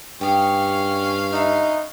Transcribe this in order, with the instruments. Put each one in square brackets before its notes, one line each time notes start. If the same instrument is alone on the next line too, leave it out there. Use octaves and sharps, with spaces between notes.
[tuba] G2 [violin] C#4 F5 [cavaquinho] G4 D#6
[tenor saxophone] D#4 [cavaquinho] B4 E5